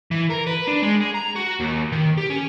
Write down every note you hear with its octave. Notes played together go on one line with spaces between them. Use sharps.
E3
A#4
B4
D4
G#3
G#4
A#5
F#4
D#2
D#3
G4
C#4